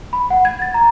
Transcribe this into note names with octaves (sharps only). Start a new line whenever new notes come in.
B5
F#5
G#6
A6
A#5